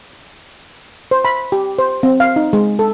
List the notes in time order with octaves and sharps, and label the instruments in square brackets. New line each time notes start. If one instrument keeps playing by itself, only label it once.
[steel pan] C5
B5
G4
C5
C4
F5
D#4
G#3
A4